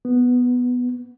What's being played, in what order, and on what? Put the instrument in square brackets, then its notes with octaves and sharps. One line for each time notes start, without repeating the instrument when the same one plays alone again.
[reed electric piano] B3